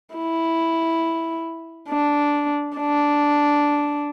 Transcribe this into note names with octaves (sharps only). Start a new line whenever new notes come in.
E4
D4
D4